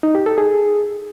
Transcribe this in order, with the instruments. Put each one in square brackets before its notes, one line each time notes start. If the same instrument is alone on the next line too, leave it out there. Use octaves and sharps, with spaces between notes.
[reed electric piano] D#4
G4
A4
G#4